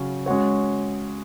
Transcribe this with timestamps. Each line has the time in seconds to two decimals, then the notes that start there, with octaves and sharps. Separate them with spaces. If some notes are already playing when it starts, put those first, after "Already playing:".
Already playing: C#3 F#3 C#4
0.26 G#3 C#4 F#4 C#5